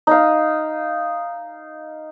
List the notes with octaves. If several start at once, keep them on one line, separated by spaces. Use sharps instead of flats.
D#4 F5